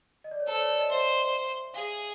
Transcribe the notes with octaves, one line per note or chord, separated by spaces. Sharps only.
D#5
D5
C#5
A4 C5
D5
C#5
D5
D#5
C5 E5
G#4 F5